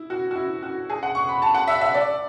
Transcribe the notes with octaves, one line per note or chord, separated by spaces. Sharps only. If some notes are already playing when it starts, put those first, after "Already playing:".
Already playing: E4
F#4
F#4
E4
F#4
G#4
F#5
C#6
B5
A5
F#5
E5
E5
D5